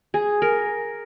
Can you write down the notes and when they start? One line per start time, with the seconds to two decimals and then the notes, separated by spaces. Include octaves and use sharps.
0.14 G#4
0.42 A#4